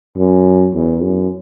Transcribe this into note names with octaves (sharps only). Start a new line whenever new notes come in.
F#2
E2
F#2